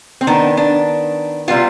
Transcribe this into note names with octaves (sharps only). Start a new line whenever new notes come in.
C4
D#3 B3 D4
D4
C3 G3 B3 F4